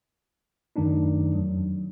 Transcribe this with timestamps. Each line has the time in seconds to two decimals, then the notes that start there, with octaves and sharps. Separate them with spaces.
0.76 F#2 D#3 A3 D4 D#4
1.34 F2 F#3